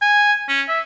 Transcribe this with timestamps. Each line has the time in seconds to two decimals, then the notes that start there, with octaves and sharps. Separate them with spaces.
0.02 G#5
0.49 C#4
0.69 E5